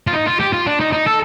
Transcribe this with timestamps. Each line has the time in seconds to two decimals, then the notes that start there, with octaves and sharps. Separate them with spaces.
0.07 F4
0.13 D#4
0.26 F4
0.40 G4
0.53 F4
0.66 D4
0.80 D#4
0.93 D#4
1.06 A4